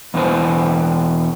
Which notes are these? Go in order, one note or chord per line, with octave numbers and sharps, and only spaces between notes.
E2 B2 E3 C4 B4 C5